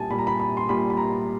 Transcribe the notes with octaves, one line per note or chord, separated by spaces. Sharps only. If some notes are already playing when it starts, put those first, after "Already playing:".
Already playing: A#2 G3 G#5 A5
A#2 G3 B5
A#5
B5
B5
C6
A#2 G3 B5
B5
A#5